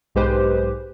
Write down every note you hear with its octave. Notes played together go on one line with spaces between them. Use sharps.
B1 G#2 G#3 G4 B4 C5